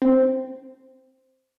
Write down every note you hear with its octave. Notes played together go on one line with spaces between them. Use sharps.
C4